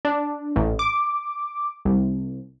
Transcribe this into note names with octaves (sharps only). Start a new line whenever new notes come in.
D4
A1
D6
C2